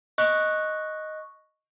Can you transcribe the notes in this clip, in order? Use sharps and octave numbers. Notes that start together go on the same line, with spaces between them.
D#5 C#6 F#6